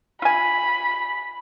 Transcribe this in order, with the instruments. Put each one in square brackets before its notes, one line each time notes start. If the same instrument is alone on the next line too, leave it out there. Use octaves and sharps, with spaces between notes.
[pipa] F4 G#5 [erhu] B5